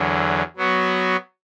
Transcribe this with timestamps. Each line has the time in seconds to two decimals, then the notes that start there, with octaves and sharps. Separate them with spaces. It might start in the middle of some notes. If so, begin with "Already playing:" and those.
Already playing: E2 D3 F#3
0.56 F#3 B3 F#4